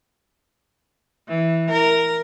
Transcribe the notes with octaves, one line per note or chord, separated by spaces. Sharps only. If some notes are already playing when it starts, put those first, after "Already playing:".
E3
A#4